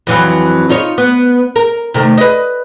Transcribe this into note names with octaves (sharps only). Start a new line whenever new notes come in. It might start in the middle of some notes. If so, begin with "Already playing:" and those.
F2 E3 F#3
D#4 F4 C#5
B3
A#4
C3 D#3 A3
B4 D#5